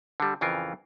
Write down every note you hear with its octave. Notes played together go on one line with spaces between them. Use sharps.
D3 G3
F2 C#3 E3 F4 A#4